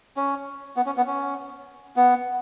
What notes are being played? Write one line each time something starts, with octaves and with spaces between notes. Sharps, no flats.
C#4
B3
C#4
B3
C#4
B3